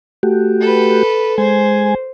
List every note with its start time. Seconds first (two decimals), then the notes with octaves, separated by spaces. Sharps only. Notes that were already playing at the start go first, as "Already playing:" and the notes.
0.23 A3 F#4 G4
0.61 A4 B4
1.38 G#3 C5 G#5